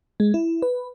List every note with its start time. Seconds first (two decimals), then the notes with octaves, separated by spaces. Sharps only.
0.20 G#3
0.34 E4
0.62 B4